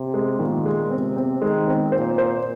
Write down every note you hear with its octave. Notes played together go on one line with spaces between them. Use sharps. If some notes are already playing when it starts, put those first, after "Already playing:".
Already playing: C3
G#3
A#2 D#3
G#3
C3 C4
C4
D#3 G#3
C4
A#2 C5
C5